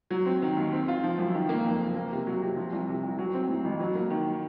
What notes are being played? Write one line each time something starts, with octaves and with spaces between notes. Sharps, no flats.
F#3
C4
D#3
D#2
C4
F4
F3
F#2
D#3
A#3
F2
F#1
A#3
C3
F#3
C3
F3
C2
C3
C2
F#3
C4
A2
A1
F#3
A#3
D#3